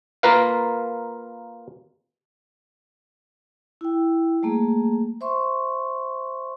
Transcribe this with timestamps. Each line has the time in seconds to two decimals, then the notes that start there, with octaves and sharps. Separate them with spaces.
0.23 A#3 F4 A#4 B4 F5
3.81 E4 G5
4.43 G3 A3 A#3 G#4
5.21 C5 E5 C6 C#6